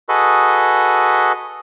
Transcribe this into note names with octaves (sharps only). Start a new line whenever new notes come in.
F#4 G#4 A4 B4 D#5